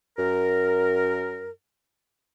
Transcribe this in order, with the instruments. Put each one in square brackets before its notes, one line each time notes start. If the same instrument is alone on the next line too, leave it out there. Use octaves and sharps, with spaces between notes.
[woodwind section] F#2 A#4